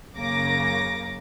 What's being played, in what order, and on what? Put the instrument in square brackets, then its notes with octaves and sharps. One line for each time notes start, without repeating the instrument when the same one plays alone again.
[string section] F#2 C#3 A#3 D6 A#6